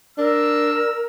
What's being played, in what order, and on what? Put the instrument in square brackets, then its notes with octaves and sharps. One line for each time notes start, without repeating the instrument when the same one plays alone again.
[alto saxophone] D4 [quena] A#4 [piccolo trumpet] E6